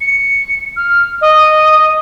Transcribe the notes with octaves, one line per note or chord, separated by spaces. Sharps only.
C#7
F6
D#5